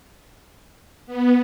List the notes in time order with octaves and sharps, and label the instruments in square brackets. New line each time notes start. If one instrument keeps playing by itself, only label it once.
[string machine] B3